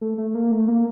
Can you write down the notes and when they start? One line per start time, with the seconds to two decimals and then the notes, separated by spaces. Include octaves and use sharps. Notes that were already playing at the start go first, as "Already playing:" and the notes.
0.01 A3
0.18 A3
0.35 A#3
0.51 A3
0.68 A#3